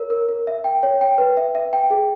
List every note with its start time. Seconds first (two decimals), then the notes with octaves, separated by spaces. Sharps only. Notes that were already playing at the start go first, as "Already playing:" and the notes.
Already playing: A#4 C#5
0.10 A#4
0.29 A#4
0.47 E5
0.64 G5
0.83 C#5
1.01 G5
1.18 B4
1.37 E5
1.55 E5
1.73 G5
1.90 G#4